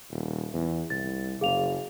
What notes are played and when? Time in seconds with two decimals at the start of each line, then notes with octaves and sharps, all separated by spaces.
0.10 D#1
0.53 E2
0.90 C2 A6
1.41 F#1 G#4 F5 F7